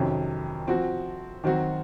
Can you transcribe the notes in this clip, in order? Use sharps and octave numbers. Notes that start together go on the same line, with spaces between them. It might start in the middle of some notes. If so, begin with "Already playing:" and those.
Already playing: F2 C3 D#3 F#3 C#4
F3 C4 F#4
D#3 F#3 C4 F#4